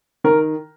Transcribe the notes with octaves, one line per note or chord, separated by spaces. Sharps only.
D#3 A#4